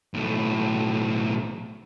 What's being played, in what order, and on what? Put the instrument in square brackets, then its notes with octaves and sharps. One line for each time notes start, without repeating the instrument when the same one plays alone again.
[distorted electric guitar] B1 A2